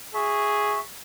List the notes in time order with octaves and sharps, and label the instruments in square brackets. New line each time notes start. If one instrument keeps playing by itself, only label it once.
[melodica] F#4 E5 [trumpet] G#4